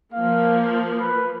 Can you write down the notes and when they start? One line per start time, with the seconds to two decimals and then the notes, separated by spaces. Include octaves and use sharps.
0.13 F3 A#3 F5
1.00 B4